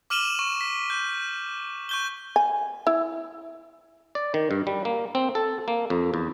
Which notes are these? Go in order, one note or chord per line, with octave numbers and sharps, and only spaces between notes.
D6 F6 D#7 E7 F#7 G7
C#6
B6
G6
C#6 G6 G7
G#5
E4
D5
D#3
G2
G3
A#3
C4
A4
A#3
F2
E2